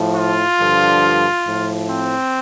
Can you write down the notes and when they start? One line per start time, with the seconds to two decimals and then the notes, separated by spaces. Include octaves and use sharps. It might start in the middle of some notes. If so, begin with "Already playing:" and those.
Already playing: A2 F3
0.15 F4
0.57 G2 D3 F3
1.44 A2 F3
1.88 C4